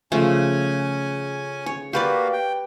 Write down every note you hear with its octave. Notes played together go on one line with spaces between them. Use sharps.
C#3 F3 A3 C#4 G#5
C#5
A#3 F#4 G4 B4 D5 F5
G5